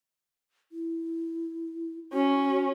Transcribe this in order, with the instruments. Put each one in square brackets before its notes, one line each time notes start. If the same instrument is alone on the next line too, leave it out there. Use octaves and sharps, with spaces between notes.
[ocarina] E4
[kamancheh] C#4 [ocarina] F#4